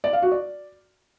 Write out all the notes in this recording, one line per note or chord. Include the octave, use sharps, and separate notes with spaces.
D5
F5
F#4
D5